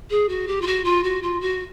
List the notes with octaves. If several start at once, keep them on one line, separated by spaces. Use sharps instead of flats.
G#4
F#4
G4
F4
F#4
F4
F#4
F4
F#4